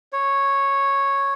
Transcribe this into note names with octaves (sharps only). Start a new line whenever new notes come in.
C#5